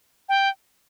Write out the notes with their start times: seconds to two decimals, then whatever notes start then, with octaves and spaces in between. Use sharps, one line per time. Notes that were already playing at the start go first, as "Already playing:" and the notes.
0.29 G5